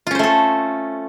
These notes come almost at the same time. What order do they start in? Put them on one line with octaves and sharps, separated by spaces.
F4 C#4 C5 A3 A4